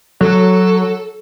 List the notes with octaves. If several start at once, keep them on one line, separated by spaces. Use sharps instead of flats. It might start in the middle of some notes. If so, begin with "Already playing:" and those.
F#3 A4